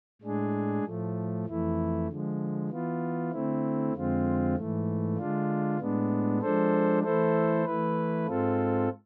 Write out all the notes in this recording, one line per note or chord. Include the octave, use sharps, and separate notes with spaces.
A2 G#3 D4 G#4
A2 F3 A3
F2 E3 A3 E4
D3 F3 G#3
E3 B3 F4
D3 A3 C4 E4
F2 D3 G#3 C4 F4
G#2 E3 A3
D3 G#3 D4 F4
A2 G#3 B3 D4
F3 G#3 D4 A4 C5
E3 A3 E4 A4 C5
E3 A3 E4 B4
G#2 G#3 C4 F4 A4